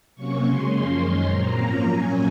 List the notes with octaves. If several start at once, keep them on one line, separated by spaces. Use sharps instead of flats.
C3 F#3 A#3 C#4 C#6
C#3 G#3 C#4 C6
F#2 F3 A#3 C#4
F#2 D#3 G#3 C#4
A#2 F#3 C4 A#5
G#2 F3 A#3 C#4
A#2 F#3 C#4 G#5